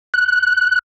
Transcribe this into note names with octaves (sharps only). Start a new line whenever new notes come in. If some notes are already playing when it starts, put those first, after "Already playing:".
F#6